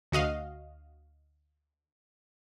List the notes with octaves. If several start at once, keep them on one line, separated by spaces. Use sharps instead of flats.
D2 F#4 D#5 F5